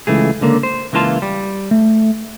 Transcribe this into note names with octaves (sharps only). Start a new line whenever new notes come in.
C#2 E3 A3 G#4
C#2 D3 A#3
C5
C#2 E3 A#3 F4 A5 C6
G3
A3